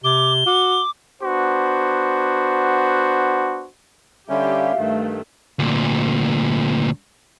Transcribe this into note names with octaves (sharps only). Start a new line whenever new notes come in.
C3 D6 G7
F#4 D6
B3 D4 F#4 C5
D3 G3 C#4 G4 E5 F5
G2 D#3 A3
D2 A#2